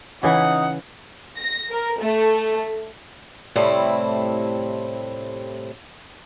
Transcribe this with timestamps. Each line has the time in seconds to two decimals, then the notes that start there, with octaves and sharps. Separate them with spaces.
0.23 C#3 E3 D#4 E4 F#5
1.37 A#6
1.70 A#4
1.99 A3
3.56 A2 C3 G3 A3 C4 E4